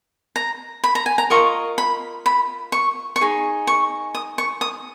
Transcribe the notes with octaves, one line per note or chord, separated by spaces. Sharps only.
A#5
B5
A#5
G#5
A#5
F4 A#4 D#5 C#6
B5
B5
C#6
C#6
D#4 G#4
C#6
D#6
C#6
D#6